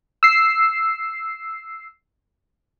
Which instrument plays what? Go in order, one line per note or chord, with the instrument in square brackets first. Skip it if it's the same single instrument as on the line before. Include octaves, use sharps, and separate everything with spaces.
[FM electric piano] E6 C7